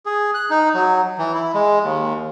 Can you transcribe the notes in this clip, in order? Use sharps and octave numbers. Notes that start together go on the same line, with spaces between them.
G#4
F#6
D#4
F#3
E3
E4
G#3
D#2